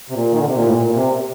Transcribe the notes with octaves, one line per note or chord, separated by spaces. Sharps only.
C3
A#2
D#3
D3
C3
A#2
A2
A#2
C3
C3